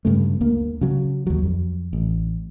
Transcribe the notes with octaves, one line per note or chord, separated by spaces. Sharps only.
G2 C#3 A3
D2 A#3
C#3 F#3
D#2 F#3
F2
A1